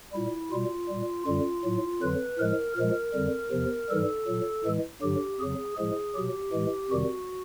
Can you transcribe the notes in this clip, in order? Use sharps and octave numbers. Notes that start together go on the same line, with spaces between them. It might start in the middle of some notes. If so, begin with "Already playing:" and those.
A#2 G3 E4
B2 G3 F4
A#2 G3
F#2 D3 G3 F4
A2 F#3
F2 D3 F#3 B4
A2 F3 G#3 A#4
A#2 F3 G#3 A#4
F2 D3 G3
E2 C3 F3
G#2 E3 G3 A4
A#2 F#3
A2 E3 G#3
G2 D3 F#3 G4
F2 C#3 F#3 G#4
A2 F3 G#3 G#4
B2 F#3 G4
A2 E3 G#3
F2 C3 D#3 G3 F#4